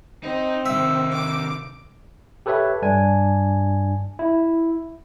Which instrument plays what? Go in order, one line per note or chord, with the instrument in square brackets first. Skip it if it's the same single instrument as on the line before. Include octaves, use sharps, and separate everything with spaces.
[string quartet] C4 [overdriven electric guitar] D#4
[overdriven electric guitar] C3 D#3 [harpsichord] E5
[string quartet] D6
[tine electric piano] G4 A4 B4 C#5 E5
G2 D4 G#5
E4